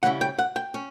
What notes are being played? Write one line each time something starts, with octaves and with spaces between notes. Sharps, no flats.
C#3 G3 C#4 E4 F#5
G5
F#5
G5
C#4